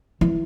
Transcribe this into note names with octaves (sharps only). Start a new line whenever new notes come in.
E3